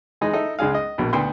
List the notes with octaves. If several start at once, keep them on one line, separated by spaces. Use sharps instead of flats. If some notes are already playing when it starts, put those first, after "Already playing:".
E3 G#3 D#4
D#4 E4 A4
C#2 G#3 D4 G#4 F5
D#5
A#1 B2
D2 B3 G5 C6